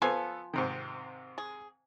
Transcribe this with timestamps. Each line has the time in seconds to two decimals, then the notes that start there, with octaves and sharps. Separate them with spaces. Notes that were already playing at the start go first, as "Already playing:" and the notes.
0.02 F3 B3 A4 F5 G#5
0.53 G#2 C3 D#3
1.38 G#4